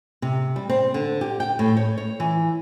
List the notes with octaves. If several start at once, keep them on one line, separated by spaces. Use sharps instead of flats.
C3
G3
C4
D3
G4
G5
A2
C#5
C#5
E3